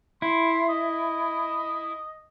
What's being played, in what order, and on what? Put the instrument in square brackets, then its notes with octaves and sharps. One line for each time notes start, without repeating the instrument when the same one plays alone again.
[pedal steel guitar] E4 [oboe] C6
[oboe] D#5